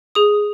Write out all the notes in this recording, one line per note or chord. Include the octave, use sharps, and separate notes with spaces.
G#4 D#6